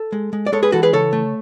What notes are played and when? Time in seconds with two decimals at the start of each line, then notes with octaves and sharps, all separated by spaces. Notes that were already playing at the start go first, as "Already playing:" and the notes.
Already playing: A4
0.12 G#3
0.33 G#3
0.46 D5
0.52 G#3 A4 C#5
0.63 G#4 B4
0.72 E3 F#4 A4
0.83 G#4 B4
0.93 C#3 A4 C#5
1.13 A3